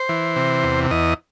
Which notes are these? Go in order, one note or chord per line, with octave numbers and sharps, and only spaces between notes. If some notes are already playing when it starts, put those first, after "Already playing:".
Already playing: C5
E3
C3
E2
E2 D#5